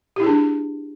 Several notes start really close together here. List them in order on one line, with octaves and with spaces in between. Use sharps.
G4 E4 G#4 D4